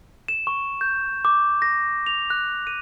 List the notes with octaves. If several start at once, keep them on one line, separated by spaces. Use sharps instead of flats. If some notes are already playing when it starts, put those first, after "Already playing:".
E7
C#6
G6
D6
A#6
F7
F#6
D#7